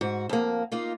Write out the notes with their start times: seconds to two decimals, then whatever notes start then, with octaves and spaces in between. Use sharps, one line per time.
0.01 G#2 F#4
0.29 F2 A#3
0.72 A#3 D#4 F4